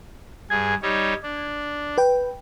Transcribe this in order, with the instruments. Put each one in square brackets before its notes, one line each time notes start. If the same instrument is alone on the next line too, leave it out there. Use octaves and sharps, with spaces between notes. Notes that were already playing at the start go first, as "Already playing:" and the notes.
[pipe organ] G2 G#4 [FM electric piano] G#6
[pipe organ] G3 D#4 C#5
D4
[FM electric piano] B4 G5